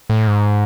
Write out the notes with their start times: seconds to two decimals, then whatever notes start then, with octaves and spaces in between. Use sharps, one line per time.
0.10 A2
0.28 G#2